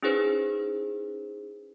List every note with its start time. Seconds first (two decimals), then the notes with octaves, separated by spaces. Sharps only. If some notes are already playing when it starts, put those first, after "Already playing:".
0.03 C#4 D#4 E4 G#4 B4 C5